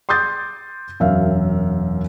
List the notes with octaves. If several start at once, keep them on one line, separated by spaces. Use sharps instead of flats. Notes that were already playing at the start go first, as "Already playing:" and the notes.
C6 D6 D#6 G6 A6
E1 F#2 E5 F5